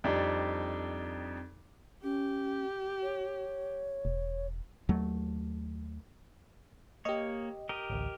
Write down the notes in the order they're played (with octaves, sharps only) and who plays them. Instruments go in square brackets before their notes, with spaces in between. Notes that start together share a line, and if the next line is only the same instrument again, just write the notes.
[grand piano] F2 G3 D4 D#4
[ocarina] C#4 [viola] G4
[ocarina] C#5
[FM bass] E1
[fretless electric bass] D#2 F#3 A3
[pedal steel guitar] A#3 C#5 [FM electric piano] G4 D#5
[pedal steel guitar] G4 A#4 D#5
[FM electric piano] A1 D2